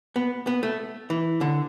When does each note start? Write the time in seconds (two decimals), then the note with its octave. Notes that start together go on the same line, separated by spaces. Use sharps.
0.16 B3
0.47 B3
0.63 A3
1.10 E3
1.41 D3